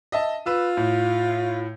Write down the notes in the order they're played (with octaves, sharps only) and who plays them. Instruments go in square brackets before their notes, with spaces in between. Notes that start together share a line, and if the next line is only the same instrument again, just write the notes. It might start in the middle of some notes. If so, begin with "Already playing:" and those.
[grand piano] D#5 E5 A5
[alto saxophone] F4 [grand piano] B4 E6
[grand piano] A2